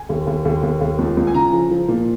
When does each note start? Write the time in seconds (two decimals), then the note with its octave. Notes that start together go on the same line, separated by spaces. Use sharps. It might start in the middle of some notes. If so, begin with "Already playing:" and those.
Already playing: G#5
0.09 D#2
0.27 D#2
0.45 D#2
0.63 D#2
0.81 D#2
0.99 C#2
1.17 C#2
1.27 G#5
1.34 C#3 A#5
1.53 F3
1.70 F3
1.88 A#2